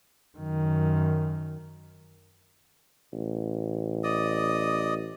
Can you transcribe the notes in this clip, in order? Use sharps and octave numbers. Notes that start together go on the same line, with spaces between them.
F#2 D#3
A1
D5 D#5 D#6